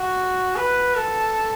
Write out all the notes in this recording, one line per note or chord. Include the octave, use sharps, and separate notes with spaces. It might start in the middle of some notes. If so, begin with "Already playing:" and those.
Already playing: F#4
B4
A4